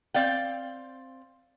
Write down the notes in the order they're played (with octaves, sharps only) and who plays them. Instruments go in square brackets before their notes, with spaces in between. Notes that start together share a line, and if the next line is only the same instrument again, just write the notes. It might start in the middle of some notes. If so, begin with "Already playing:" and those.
[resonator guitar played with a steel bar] C4 D5 F5 G5